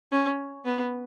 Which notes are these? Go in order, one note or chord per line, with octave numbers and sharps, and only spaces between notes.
C#4
B3